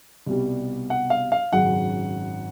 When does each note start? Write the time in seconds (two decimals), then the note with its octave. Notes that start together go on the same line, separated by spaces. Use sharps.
0.26 C2 B2 G3
0.90 F#5
1.10 F5
1.32 F5
1.52 G#1 F#2 C#3 F#5